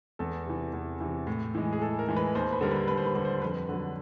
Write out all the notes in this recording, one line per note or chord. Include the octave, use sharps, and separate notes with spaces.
E2 A4
C3 E3
E2
C3 E3
A2
E3 G#3
G#4
A2 A4
A#4
E3 G#3
B4
D#2 C5
B4
D3 G3 A#4
B4
D#2 B4
C5
B4
D3 G3
C5
F2 B4
D3 F#3